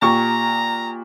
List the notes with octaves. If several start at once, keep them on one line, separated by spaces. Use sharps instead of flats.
A#2 G4 A#5 C#6